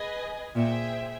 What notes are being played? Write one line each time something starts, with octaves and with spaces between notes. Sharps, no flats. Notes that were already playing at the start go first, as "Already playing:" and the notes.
Already playing: G#4 B4 D#5 G#5
A#2 G#4 C5 E5 G5